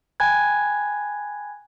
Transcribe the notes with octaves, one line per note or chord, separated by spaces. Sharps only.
G5 G#5 B5 F#6 G#6